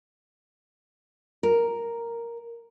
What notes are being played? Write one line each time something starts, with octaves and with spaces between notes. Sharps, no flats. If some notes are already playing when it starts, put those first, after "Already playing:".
A#4